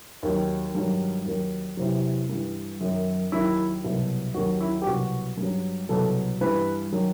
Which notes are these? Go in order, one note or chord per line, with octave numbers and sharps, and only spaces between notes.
D#2 D#3 F#3
G2 D#3 F#3
D#2 D#3 F#3
E2 C3 F#3
G2 E3
F#2 D#3 F#3
D#2 D#3 F#3 E4
C2 B2 F#3
D#2 D#3 F#3 F#4
E4
G4
C2 B2 F#3 F#4
G2
F#3
C2 B2 F#3 A4
G2 E3 B4
D#3 F#3